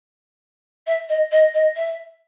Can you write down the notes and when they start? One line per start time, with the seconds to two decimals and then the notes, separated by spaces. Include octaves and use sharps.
0.87 E5
1.09 D#5
1.31 D#5
1.53 D#5
1.76 E5